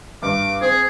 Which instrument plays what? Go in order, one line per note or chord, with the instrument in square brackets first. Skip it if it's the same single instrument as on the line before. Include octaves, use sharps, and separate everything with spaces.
[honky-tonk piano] G2 [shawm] D6
[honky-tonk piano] C4 [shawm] G#4